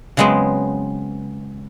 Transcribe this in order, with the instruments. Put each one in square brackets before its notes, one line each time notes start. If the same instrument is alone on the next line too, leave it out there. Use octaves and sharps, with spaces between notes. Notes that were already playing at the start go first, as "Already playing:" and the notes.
[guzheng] C#3 F#3 G#3 B3 C4